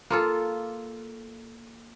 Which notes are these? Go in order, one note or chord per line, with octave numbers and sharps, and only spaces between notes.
A#3 F4 A4